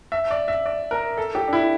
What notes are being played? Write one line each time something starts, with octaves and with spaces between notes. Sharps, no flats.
E5
D5
E5
D5
A#4
A4
G4
D4
E4